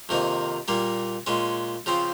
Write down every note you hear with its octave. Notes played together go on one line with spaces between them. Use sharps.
F2 C3 D#3 A#3
A#2 G3 A#3
A#2 G#3 C#4
C#3 F3 C4